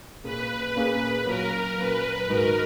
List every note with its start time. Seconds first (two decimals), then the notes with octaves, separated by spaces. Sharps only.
0.24 A#2 A#3 C#4 G#4 B4
0.75 A#2 A#3 C#4 G#4
1.26 A#2 F#3 A#3 C#4 A#4
1.77 A#2 F#3 A#3 C#4 B4
2.28 G#2 D#3 G#3 D#4 F#4 A#4